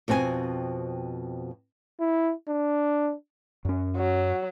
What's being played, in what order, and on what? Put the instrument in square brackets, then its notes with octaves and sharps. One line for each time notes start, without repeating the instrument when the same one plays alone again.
[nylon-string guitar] F2 B2 C4 A4 G#5
[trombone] E4
D4
[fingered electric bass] F#2 C#4
[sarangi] F#3